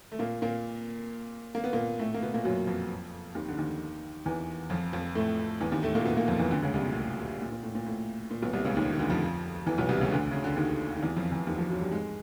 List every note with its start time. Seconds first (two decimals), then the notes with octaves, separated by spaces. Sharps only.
0.12 A3
0.19 A#2 A#3
0.42 A#2 A#3
1.55 A#3
1.64 B3
1.73 A#2 A#3
1.99 A2 A3
2.14 A#3
2.22 B2 B3
2.34 A#2 A#3
2.44 F#2 F#3
2.67 F2 F3
3.35 D#2 D#3
3.48 D3
3.57 D#2 D#3
4.26 E2 E3
4.70 F2 F3
4.93 F2 F3
5.15 A2 A3
5.61 E2 E3
5.72 D#2 D#3
5.83 A2 A3
5.95 A#2 A#3
6.05 B2 B3
6.17 A#2 A#3
6.28 F2 F3
6.39 E2 E3
6.51 D2 D3
6.62 C#2 C#3
6.74 C2 C3
6.85 A#2
6.96 A2
7.42 A#2
7.52 A#2
7.63 A2
7.75 A#2
7.86 A2
8.31 A#2
8.42 B1 B2
8.53 C2 C3
8.65 C#2 C#3
8.76 D#2 D#3
8.92 D#3
8.99 D2 D3
9.10 F2 F3
9.66 E2 E3
9.78 B1 B2
9.89 C2 C3
10.00 C#2 C#3
10.11 D2 D3
10.31 C#3
10.44 D3
10.57 D#2 D#3
10.95 D#3
11.02 E2 E3
11.16 F2 F3
11.31 E2 E3
11.47 D#2 D#3
11.58 F2 F3
11.70 F#2 F#3
11.81 G2 G3
11.91 G#2 G#3